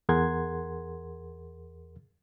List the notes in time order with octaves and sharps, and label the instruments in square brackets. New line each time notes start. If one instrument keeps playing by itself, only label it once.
[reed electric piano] E2 G#4 A#4 F#5 C6 G#6